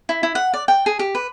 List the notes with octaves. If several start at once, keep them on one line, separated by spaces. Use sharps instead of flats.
E4
E4
F#5
D5
G5
G#4
G4
B4